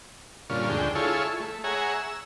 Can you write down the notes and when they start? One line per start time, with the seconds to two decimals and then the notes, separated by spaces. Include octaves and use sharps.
0.50 G2 A#2 D3 C#4 F4
0.69 D2 D3 G#3 G5
0.95 E4 F4 G#4 A4 C#5
1.40 A3
1.64 G#4 C#5 E5 F#5 G#5 A#5
1.94 E6